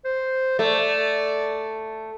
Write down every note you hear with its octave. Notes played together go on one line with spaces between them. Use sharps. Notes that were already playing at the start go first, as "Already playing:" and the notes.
C5
A3 D5